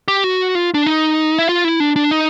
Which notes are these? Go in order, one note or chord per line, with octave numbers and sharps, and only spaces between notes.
G4
F#4
F4
D4
D#4
E4
F4
E4
D4
D4
D#4